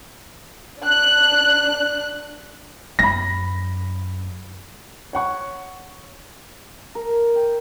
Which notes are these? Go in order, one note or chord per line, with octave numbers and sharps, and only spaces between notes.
D4 F#6
F#2 B5 A#6
C#5 F#5 C#6
A#4
G5